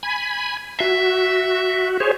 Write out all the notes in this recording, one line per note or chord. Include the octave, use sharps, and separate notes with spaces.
G#5 B5
F#4 E5
G#4 C5 C#5